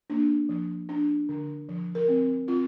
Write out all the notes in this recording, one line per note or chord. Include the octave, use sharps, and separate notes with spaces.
A#3 D4
F3
D4
D3
F3
A#4
C4
C4 F4